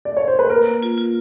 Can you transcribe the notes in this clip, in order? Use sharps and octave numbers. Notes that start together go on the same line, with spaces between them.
D5
C#5
C5
B4
A#3 A#4
A#3
F4
F4